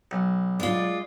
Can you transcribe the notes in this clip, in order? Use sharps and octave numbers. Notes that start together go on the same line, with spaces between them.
B1
G#3 F4 D5